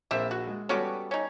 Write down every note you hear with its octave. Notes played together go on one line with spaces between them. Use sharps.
A#1 C4 A#4 E5
F#4
G#3
G3 B3 C#4 F#4 G4 A4
C#4 D#4